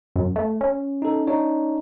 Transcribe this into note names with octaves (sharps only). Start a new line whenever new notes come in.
F#2
A3
C#4
D#4 A4
D4 D#4 C#5